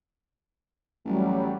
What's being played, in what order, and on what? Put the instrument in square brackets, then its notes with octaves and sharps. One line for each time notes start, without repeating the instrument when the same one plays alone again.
[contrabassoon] A1 [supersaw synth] F#3 G3